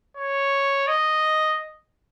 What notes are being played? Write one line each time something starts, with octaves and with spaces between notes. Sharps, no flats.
C#5
D#5